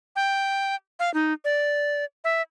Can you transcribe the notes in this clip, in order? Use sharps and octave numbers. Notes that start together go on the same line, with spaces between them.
G5
F5
D#4
D5
E5